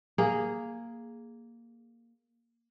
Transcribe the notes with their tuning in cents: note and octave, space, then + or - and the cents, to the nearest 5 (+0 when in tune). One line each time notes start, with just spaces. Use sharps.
A#3 +0 G#4 +0